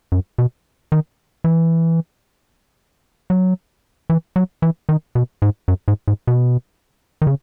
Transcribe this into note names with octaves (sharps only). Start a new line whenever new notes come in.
F#2
B2
D#3
E3
F#3
E3
F#3
E3
D#3
B2
G#2
F#2
G#2
G#2
B2
D#3
C#3